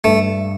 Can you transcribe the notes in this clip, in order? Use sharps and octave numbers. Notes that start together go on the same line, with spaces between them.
G2 A3